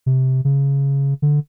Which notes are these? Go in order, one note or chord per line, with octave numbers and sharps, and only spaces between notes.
C3
C#3
D3